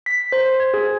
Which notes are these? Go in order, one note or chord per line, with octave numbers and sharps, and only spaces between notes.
B6
C5
G#6
G#4